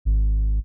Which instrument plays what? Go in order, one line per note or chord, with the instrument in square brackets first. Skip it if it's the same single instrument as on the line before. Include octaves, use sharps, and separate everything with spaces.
[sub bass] G#1